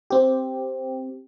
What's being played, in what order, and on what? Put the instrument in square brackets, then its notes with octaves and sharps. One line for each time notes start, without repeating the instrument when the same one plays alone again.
[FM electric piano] C4 G4